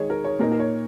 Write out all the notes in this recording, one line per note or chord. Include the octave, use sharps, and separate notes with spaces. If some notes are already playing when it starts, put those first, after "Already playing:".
Already playing: D#3 G#3 D#4 C#5
A#4
C#5
A#2 A#3 D#4 A#4
A#4
C#5